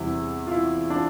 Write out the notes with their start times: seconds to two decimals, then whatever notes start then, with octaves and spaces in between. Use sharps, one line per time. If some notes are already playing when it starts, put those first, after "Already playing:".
Already playing: E2 C3 G3 E4
0.47 F4
0.51 E4
0.90 D4 F4